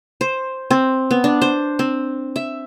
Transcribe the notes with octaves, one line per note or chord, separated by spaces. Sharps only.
C5
C4
B3
D4
C5
C4
E5